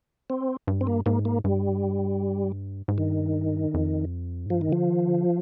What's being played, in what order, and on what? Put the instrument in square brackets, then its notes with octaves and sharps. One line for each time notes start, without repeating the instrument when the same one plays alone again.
[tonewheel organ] C4
[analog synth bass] G2
[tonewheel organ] C4
A#3
[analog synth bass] G#2 [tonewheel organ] A#3
[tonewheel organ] A#3
[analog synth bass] G2 [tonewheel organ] G3
[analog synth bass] G#2
[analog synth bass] G2 [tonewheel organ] D#3
[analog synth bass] F2
G#2
[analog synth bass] G2 [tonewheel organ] F3
[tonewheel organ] D#3
[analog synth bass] D3 [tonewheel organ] F3
[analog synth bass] D#3
D3